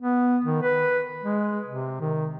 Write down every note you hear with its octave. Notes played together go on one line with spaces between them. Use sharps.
B3
D#3
B4
G#3
C3
D#3